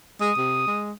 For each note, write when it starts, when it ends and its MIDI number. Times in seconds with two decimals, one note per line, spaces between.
0.21 0.31 56
0.21 0.87 87
0.38 0.62 48
0.67 0.92 56